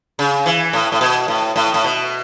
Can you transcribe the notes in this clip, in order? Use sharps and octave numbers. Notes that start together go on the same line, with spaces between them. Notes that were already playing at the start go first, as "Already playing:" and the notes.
C#3
E3
A2
A2
B2
A2
A2
A2
B2